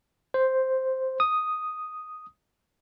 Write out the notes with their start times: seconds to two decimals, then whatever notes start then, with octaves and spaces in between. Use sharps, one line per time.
0.34 C5
1.20 D#6